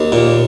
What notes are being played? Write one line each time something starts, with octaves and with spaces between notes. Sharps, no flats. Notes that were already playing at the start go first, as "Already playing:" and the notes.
Already playing: D#2
A#2